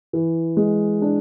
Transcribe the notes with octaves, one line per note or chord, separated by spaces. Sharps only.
E3
G#3
D4